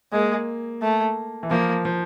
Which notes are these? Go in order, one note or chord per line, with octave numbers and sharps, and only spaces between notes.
G#3 A#3
A3
E3
F3 A#3
F3